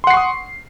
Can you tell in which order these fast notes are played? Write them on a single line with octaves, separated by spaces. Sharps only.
C6 F#5 C7 C#6 D#6